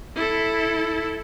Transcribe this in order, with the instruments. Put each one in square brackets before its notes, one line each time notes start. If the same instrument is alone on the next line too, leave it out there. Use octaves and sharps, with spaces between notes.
[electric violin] E4 A4